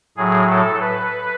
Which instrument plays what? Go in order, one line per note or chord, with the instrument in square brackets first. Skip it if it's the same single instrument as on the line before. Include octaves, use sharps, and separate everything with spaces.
[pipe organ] A2 F#3 G#4
A4
B4